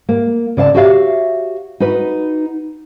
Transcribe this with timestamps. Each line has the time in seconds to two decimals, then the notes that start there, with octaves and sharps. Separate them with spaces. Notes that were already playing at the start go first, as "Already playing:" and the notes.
0.09 A#3
0.57 C#3 D5 F5 A5
0.74 F#4 G4 C#5 E5 F5
1.80 D#4 F#4 B4